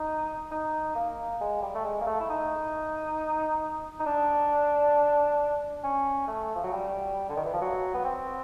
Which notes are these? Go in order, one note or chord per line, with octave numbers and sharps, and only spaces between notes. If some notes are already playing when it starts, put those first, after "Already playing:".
Already playing: D#4
D#4
A#3
G#3
G3
A3
G#3
A#3
A3
E4
D#4
D#4
D4
C#4
A3
F3
F#3
G3
D3
D#3
E3
F3
F#3
B3
C4